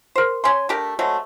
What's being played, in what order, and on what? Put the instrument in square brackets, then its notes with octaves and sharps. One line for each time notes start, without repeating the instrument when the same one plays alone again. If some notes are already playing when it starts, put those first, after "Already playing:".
[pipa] A#4 C5
C#4 G#5 C6
A3 D4 G4 A#4
C3 F#3 G#3 A3